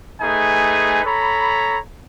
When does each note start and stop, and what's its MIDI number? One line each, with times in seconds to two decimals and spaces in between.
0.21 1.01 57
0.21 1.01 63
0.21 1.01 68
0.21 1.01 71
0.21 1.01 80
1.05 1.78 69
1.05 1.78 73
1.05 1.78 82
1.05 1.78 83